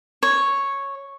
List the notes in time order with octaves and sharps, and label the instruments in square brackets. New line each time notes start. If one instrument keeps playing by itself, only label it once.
[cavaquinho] C#5